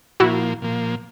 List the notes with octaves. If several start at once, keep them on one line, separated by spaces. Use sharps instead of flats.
A#2 F3 A#3 E4 F#4
A#2 F3 A#3